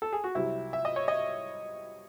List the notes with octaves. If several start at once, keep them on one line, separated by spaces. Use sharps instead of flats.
A4
G#4
F#4
C2 C3 F#3 E4
E5
D#5
C#5
D#5